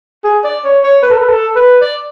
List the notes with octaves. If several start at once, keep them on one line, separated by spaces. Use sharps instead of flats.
G#4
D5
C#5
C#5
B4
A4
B4
A4
B4
D5